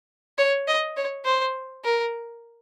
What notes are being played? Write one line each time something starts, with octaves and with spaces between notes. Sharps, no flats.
C#5
D#5
C#5
C5
A#4